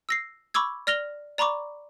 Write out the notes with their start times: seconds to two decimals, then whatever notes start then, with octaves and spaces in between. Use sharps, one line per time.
0.09 E6 A#6 C7
0.54 B5 C#6 D6 E6 G#6
0.87 D5 F6 A#6 F7 G7
1.38 D5 A#5 B5 C#6 D6